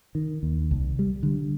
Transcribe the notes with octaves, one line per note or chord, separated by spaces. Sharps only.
D#3
D#2
C2
G3
D3